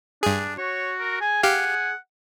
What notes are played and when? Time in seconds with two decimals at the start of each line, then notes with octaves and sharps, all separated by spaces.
0.23 G2 D4 G#4
0.58 F#4 C#5
1.00 A#4
1.21 G#4 G#5
1.43 G4 F5 F#5